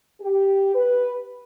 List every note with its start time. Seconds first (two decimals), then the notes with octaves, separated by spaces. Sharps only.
0.21 G4
0.75 B4